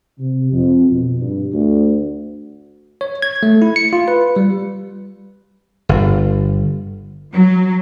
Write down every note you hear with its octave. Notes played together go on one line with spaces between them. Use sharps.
C3
F2
B2
G2
D2
C#5
G#6
A3
E4
C#7
F4
B4
G3
G1
F#3